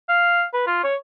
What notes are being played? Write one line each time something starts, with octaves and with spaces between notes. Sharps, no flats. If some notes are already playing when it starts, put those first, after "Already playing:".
F5
B4
F4
C#5